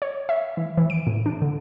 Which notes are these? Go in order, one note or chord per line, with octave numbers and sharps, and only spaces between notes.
C#5
E5
E3
E3
D7
A2
D4
D3